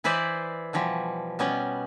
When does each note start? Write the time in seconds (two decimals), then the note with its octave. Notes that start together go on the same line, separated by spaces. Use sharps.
0.04 E3 E4 B4 C5 D5 D#5
0.73 B2 E3 F3 G3
1.39 B2 G3 B3 C#4 D#5